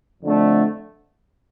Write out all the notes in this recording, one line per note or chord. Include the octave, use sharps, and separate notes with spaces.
F2 D3 A3 D4